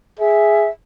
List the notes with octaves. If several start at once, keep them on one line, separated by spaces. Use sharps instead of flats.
G#4 E5